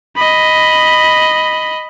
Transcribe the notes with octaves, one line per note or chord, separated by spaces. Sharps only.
D#5 B5